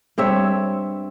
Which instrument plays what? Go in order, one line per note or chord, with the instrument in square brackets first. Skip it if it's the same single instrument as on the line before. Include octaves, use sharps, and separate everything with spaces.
[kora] G2 C4 C#5 E5